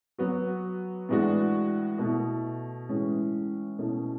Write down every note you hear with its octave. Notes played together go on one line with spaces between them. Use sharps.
F#3 B3 F#4
A2 E3 G#3 D4 F#4
B2 A3 E4
A2 E3 G#3 C#4
B2 A3 C#4 E4